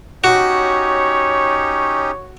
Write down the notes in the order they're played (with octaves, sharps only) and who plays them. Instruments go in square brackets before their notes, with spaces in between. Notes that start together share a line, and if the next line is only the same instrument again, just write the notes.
[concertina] C#4 D#4 G4 [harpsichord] F#4 [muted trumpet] C#5